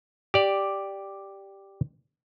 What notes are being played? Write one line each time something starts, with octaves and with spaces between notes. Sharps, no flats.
G4 D5